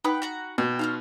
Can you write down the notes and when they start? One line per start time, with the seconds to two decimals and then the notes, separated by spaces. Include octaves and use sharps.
0.04 D#4 B4 F#5 G5 B5 D#6
0.22 F#4 F#5 A#5
0.58 B2 G5
0.79 C#4 D#4 F4 F5